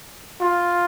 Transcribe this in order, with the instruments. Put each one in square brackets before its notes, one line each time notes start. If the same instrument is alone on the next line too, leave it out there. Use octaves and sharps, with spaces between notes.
[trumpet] F4